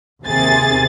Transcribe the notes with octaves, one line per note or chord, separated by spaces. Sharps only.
D#2 C3 G#4 A6